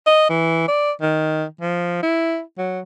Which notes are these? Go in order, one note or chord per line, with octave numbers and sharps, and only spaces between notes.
D#5
E3
D5
D#3
F3
E4
F#3